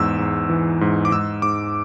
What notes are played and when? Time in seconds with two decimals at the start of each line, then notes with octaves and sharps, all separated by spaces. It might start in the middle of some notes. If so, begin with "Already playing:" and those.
Already playing: E2 G#2 E6
0.19 G#2
0.50 E3
0.81 G#2
1.05 D6
1.12 G#2 E6
1.42 G#2 D6